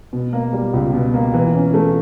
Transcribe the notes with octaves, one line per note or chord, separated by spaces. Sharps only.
B2
A#3
G3
C#2
B2
A#3
E3
C#4
A3